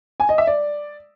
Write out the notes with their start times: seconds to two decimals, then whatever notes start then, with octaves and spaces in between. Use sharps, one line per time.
0.20 G#5
0.29 D#5
0.38 E5
0.47 D5